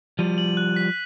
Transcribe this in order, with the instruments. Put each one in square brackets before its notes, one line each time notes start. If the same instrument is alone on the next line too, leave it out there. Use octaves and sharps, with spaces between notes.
[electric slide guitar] F3 G3 [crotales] D#7
[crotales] F#7
F#6
B6